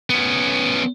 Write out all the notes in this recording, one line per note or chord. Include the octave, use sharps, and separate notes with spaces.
B3 C#4